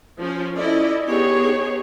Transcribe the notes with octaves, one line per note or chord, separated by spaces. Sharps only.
F3 C#4 C5
C#4 E4 A4 D5 D#5
B3 D#4 G4 G#4 C#5